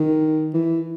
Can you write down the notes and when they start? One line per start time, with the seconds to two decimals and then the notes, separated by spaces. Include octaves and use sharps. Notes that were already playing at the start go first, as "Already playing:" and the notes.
Already playing: D#3
0.54 E3